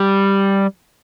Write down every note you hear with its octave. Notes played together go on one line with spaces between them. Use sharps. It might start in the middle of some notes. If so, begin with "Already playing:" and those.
Already playing: G3